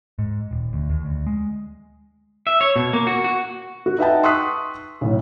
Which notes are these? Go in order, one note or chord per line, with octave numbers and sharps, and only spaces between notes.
G#2
D#1
D2
D#2
D2
G#3
E5
C#5
B2
A#3
F#4
F#4
F#4
D#4 B4 E5 F#5 G5 A5
C6 C#6 D#6 E6 F#6 B6
B1 A2